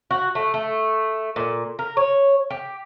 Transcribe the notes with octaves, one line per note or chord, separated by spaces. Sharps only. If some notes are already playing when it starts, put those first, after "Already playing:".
F#4
A3
A3
A#2
A#4
C#5
G4